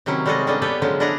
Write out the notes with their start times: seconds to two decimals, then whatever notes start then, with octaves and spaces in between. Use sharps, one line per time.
0.06 C3 D#3 F#3 C#4 E4
0.26 G3 G#3 F#4 G#4 A4 D#5
0.47 G3 A#3 C#4 D4 A4 D#5
0.62 B3 G4 A4 B4 C#5 G5
0.82 D3 F3 F#3 G#3 C#4
1.00 D4 E4 D#5 F#5 A#5